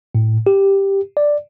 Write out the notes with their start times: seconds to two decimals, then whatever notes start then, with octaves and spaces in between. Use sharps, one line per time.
0.15 A2
0.47 G4
1.17 D5